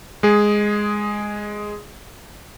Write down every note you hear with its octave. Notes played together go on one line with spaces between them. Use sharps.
G#3 G#4